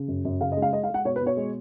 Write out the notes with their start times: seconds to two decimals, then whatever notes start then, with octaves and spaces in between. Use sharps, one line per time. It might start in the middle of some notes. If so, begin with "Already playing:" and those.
Already playing: C#3
0.08 F#2
0.25 F#2
0.41 C#3 F5
0.52 D#5
0.57 G#3
0.62 F5
0.73 G#3 D#5
0.83 F5
0.89 G#3 F#5
1.05 B2 C#5
1.16 B4
1.21 B2
1.26 C#5
1.37 G#3